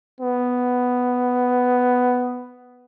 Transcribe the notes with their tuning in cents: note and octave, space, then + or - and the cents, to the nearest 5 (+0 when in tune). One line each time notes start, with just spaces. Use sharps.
B3 +5